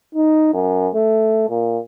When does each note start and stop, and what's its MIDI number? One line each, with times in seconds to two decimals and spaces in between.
0.15 0.51 63
0.54 0.88 42
0.94 1.46 57
1.50 1.78 46